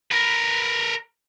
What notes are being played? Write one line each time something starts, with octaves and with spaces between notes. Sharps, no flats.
A#4 B4